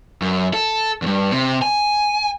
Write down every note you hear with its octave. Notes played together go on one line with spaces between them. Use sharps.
F#2
A4
E2 G2
C3
G#5